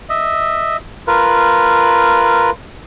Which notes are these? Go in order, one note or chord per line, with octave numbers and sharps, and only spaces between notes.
D#5 E5
F4 A#4 B4